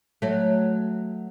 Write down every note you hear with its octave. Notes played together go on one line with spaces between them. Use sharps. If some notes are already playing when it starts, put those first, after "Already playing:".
F#3 A3